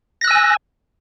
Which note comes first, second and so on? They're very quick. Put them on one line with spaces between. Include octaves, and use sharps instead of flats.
A#6 F#6 E6 G#5